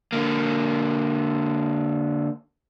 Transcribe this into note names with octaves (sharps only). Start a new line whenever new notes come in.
D3 A#3